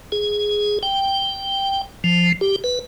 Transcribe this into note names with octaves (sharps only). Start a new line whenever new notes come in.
G#4
G5
F3
G4
B4